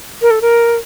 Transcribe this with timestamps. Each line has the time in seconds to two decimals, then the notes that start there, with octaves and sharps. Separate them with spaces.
0.22 A#4
0.31 A4
0.41 A#4